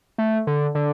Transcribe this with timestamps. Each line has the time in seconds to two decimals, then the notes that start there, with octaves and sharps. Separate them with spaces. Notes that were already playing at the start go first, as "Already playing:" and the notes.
0.18 A3
0.47 D3
0.75 D3